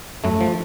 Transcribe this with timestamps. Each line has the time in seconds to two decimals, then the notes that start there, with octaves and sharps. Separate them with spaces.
0.24 F#2 A3
0.41 F3